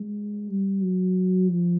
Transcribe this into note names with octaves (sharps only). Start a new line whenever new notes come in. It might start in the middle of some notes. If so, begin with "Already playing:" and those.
Already playing: G#3
G3
F#3
F3